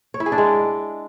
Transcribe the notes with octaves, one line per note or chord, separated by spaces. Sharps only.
C#5
E4
G#4
D4
G#3